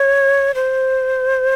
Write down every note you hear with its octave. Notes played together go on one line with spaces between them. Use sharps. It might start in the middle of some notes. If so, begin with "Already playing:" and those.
Already playing: C#5
C5